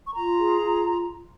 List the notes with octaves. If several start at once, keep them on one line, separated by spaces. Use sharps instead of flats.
C#6
F4 A#5
G#4
F4